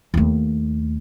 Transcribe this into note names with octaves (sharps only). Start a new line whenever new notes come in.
D#2 A3